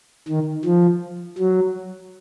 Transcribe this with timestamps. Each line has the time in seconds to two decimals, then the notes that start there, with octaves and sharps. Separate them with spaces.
0.28 D#3
0.65 F3
1.38 F#3